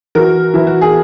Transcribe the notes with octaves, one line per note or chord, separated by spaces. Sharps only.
E3 F#4 A#4
E3 E4
F#4
G#4